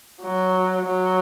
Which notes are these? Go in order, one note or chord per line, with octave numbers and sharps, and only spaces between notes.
F#3
F#3